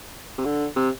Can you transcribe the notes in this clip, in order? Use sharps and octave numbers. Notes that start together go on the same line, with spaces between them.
C3
D3
C3